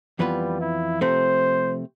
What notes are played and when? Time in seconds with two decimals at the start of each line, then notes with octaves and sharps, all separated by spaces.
0.19 F2 E3 G3 B3 F4 B4
0.61 E4
1.01 C3 F3 A3 C4 C5